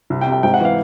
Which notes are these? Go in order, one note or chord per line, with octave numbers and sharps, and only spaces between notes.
C2
G5
C3
G5
G#2 G5
F#5
E3 F5